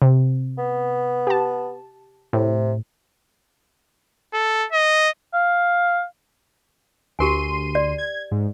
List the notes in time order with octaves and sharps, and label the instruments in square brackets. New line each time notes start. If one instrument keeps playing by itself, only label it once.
[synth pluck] C3
[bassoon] B3
[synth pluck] G4 A5
[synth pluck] A2 [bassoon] C3
[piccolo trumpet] A4
D#5
[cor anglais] F5
[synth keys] D2 C6 D#7 [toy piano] G4 A#4 G#5
[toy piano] D5
[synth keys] G#6
G#2